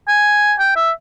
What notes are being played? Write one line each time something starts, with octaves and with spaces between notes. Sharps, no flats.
G#5
G5
E5